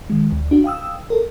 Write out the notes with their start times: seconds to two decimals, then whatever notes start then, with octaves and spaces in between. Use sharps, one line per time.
0.10 D#3 G#3
0.32 D2
0.51 D4 F#4
0.64 F5 G5 D#6 E6
1.10 A4 A#4